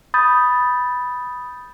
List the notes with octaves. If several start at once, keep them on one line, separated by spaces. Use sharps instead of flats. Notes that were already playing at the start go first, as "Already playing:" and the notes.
B5 D#6 G6 A6